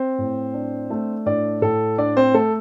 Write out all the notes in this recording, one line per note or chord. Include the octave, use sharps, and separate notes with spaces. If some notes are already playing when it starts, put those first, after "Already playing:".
Already playing: C4 C5
A2
D4
A3
A2 D4 D5
A2 A4
D4 D5
C4 C5
A3 A4